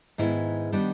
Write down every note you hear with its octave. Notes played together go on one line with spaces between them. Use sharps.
G#2 D#3 G#3 B3 E4
D#3 G3 B3 D4